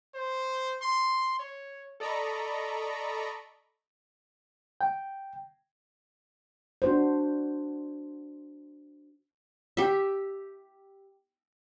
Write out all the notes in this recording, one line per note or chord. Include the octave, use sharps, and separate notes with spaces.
C5
C6
C#5
A4 D5 D#5 A#5 B5 C#6
G5
D4 F#4 C5
G4 E5